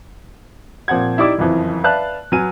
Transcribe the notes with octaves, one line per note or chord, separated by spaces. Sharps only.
A#2 F3 C4 F#5 G#6
D#4 E4 G4 D5 E5 D6
F#1 F2 E3 F3
B4 D5 E5 F5 A5 F#6
F#3 B4 G#5 F6 D#7